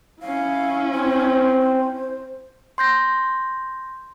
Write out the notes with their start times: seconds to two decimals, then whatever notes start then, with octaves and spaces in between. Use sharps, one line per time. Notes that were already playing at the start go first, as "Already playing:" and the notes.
0.22 C#4 E4 F5
0.94 C4 C5
2.78 C6 G6 A#6